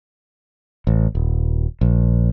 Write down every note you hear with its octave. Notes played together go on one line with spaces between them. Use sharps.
A1
D#1
A#1